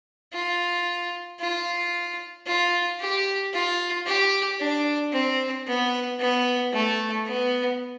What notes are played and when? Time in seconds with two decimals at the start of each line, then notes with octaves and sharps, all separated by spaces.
0.33 F4
1.40 F4
2.46 F4
3.00 G4
3.53 F4
4.06 G4
4.60 D4
5.12 C4
5.67 B3
6.20 B3
6.73 A3
7.26 B3